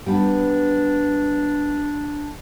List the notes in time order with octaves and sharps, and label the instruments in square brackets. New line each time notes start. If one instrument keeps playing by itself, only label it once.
[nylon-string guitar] G3 B3 [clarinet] D4